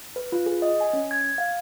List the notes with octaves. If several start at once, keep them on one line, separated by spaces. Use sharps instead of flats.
B4
F4
G#4
D#5
G#5
C#4
G#6
F5